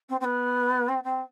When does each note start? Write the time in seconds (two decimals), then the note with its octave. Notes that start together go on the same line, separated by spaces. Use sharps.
0.09 C4
0.20 C4
0.24 B3
0.88 C4
1.03 C4